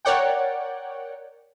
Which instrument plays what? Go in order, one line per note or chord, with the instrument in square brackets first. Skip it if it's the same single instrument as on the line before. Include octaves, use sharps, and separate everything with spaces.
[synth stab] A#4 C#5 D5 F#5 G5